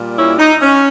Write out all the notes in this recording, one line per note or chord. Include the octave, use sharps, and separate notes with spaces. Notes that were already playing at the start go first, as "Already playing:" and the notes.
Already playing: A#2 G3
C#4 E4
D#4
C#4